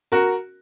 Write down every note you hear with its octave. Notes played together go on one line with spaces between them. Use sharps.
F#4 A#4